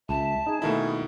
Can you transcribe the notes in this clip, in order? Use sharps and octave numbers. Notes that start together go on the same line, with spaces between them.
C#2 E5 A5
D#4 G#4
B2 D#3 A3 A#3 E4 D#5